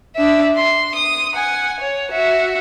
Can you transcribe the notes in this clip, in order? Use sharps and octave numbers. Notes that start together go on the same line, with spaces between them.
D4 E5
C6
D#6
F#5 G#5
C#5
F#4 E5